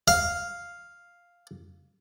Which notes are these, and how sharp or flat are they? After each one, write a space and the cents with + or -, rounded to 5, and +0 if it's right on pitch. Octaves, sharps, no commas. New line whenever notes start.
F5 +0